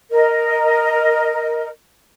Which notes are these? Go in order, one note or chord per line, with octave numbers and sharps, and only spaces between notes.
A#4 D#5